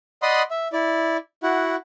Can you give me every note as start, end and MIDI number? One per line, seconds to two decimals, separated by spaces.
0.22 0.42 74
0.22 0.42 75
0.22 0.42 78
0.22 0.42 83
0.22 0.42 84
0.22 0.42 87
0.51 0.68 76
0.73 1.17 64
0.73 1.17 74
1.43 1.76 64
1.43 1.76 66
1.43 1.76 78